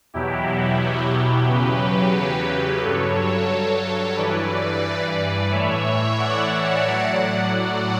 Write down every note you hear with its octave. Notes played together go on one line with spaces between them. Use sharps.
E2 B2 F#3 E4 G4
E2 C#3 F#3 G4 B4
G2 F#3 A4 C#5
A4 C#5
G2 E3 B4 D5
A2 E3 C#5 E5
D5 F#5
A2 F#3
D5 F#5